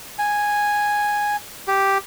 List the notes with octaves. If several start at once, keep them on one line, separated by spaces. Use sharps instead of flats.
G#5
G4